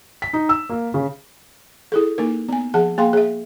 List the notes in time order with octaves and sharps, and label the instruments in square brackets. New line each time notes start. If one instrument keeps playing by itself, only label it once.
[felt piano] B6
D#4
E6
A#3
C#3
[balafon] E4 G#4 A4
A#3 D#4 A#4
B3 G#5
F3 G#4 F#5 A5
A#3 G#4 F5 G5 C6
G#4 E5